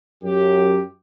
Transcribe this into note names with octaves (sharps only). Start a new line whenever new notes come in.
F#2 G4